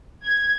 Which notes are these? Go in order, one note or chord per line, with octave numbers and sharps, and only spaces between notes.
G#6